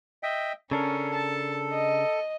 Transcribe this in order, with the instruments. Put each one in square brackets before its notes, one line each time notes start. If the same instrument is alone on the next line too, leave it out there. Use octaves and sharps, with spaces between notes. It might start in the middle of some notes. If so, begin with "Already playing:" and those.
[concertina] D#5 E5 G5
[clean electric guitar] C#3 D4 A#4 [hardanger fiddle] C#4 [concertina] A4
[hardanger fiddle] A5
D#5